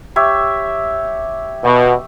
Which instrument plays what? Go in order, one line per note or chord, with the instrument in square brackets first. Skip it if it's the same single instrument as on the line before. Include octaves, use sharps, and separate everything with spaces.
[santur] G4 C#5 E5
[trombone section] B2